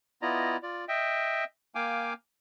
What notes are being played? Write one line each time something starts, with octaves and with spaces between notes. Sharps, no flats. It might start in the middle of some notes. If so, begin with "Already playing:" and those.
B3 E4 F4 D5 D#5 A#5
F4 D5
D#5 E5 G5
A#3 F5 G5 G#5 D6